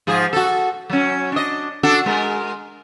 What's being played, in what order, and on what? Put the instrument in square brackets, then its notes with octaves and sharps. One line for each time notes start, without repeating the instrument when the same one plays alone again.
[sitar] G#2 F3 G#4
F#4 A4
F#3 C#4
D4 D#5
D4 F#4 A4
G#3 A#4